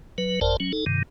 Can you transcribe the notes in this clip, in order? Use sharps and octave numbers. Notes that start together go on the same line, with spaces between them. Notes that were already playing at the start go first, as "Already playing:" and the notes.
F#3 B4
G1 F2 A#4 C5 D5 A5
F#3 C#4
D#4 A4
G2 C3 D#3